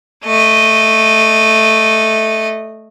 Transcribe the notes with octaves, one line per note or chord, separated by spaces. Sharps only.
A3 D#5